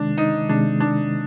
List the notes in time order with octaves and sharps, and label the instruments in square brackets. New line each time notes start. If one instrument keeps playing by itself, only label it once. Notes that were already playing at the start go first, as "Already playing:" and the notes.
Already playing: [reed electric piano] C3 D#3 G#3 [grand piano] D4
[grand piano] D#4
[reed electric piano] C3 D#3 G#3 [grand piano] D4
[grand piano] D4